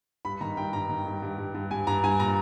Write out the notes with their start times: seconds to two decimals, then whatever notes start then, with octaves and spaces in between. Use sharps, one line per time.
0.25 G2 B5
0.41 D#3 A#5
0.57 G2 G5
0.73 G2 A#5
0.89 D#3
1.06 G2
1.22 G2
1.38 G2
1.54 G2
1.71 G2 G#5
1.87 G2 A#5
2.04 G2 G#5
2.20 A#2 A#5